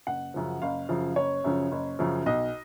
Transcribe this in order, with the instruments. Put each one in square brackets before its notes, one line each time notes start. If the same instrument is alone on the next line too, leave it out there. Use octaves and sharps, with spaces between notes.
[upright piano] F#1 F#5
F#2 C#3 F3
F#1 F5
F#2 C#3 F3
F#1 C#5
F#2 C#3 F3
F#1
F#2 C#3 F3
B1 D#5